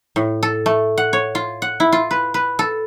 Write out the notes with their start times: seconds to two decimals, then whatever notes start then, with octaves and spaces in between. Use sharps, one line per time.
0.16 A2
0.43 A4
0.66 A3
0.98 F#5
1.13 C#5
1.35 F4
1.62 F#5
1.80 E4
1.93 F4
2.11 B4
2.34 B4
2.59 A4